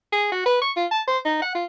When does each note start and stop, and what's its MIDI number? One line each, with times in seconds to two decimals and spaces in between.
0.12 0.30 68
0.32 0.44 66
0.46 0.60 71
0.61 0.71 85
0.77 0.86 65
0.91 1.01 81
1.07 1.18 72
1.25 1.41 63
1.42 1.50 78
1.55 1.64 65